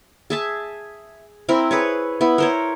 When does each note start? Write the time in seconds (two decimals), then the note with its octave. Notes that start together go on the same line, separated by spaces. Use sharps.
0.30 G#4 E5 A5
1.49 C4 E4 A#4
1.71 G#4 B4 C#5
2.21 B3 E4
2.38 A#4 C5 C#5